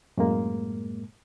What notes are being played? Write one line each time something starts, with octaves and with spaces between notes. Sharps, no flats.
F#2 A2 G#3 A#3